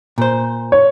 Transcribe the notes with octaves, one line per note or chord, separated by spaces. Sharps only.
A#2 C5
C#5